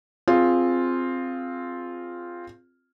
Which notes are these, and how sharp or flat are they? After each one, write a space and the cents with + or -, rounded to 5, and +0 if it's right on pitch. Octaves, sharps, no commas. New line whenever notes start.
C4 +0 F4 +0 G#4 +0